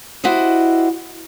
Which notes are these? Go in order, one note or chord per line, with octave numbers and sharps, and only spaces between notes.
E4 F#4 G4 C5 D#5